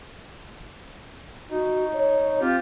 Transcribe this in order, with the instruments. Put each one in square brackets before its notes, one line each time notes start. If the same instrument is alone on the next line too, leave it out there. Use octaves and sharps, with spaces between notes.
[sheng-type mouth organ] D#4 [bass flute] F#4
[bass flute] C#5
[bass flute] C4 [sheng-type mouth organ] F4 G4